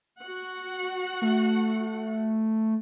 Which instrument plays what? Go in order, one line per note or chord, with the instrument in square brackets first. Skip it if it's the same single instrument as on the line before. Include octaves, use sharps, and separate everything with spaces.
[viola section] F#4 F#5
[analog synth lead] A3